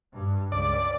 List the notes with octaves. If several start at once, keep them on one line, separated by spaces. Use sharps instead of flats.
G2
C#2 D5